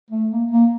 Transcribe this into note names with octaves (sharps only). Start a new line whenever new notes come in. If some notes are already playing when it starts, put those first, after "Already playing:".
A3
A#3
A#3